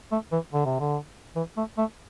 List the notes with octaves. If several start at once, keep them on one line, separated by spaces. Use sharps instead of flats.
A3
E3
D3
C3
D3
E3
A3
A3